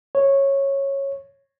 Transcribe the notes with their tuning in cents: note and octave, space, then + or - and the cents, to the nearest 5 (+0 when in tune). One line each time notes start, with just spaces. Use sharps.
C#5 -10